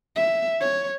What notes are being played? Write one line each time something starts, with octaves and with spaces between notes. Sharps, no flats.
E5
C#5